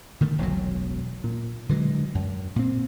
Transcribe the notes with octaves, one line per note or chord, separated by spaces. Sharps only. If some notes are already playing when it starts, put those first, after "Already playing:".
D3 D#3 A3
E1 B1 F#2 F#3
A#2
D3 E3 F#3 G#3
F#2
A#2 C4